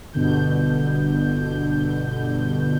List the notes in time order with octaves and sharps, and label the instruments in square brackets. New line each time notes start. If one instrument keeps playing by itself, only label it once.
[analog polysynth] G1 B2 D3 G6